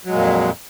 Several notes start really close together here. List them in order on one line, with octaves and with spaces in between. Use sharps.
F#3 G#3 A#2 F2